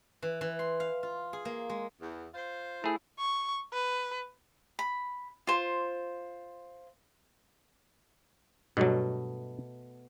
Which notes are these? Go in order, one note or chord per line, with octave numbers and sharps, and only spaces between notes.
E3
E3
C6
F5
F4
G#4
A#3
G#3
E2
F4 C5
A3 E4 G#4
C#6
B4
B5
F4 C5
G2 B2 F#3 A3